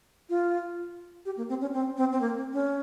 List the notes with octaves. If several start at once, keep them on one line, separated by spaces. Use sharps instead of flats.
F4
G4
A#3
C4
C#4
C4
C4
C4
A#3
C4
C#4